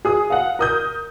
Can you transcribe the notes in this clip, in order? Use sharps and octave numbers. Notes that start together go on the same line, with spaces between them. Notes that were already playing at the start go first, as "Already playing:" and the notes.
G#4 D#6
F5 F#5
A#4 D#6 G6